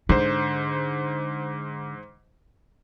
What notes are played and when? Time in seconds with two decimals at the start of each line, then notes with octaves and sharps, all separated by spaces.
0.09 G#2 D3 C5